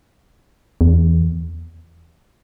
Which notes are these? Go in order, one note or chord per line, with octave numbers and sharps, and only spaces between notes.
E2